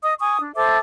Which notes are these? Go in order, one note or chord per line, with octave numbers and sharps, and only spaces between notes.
D#5 D#6
G#5 C#6 D#6
D4
A4 C5 E5 D6